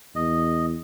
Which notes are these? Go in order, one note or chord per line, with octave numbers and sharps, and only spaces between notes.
E2 D#5